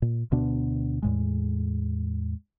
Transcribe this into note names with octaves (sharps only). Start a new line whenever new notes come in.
A#2
D2 B2 B3 D4
E2 A2 G#3